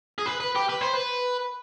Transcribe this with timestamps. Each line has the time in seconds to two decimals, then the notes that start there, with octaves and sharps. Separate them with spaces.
0.18 G#4
0.26 B4
0.40 B4
0.55 G4
0.69 B4
0.81 C5
0.93 B4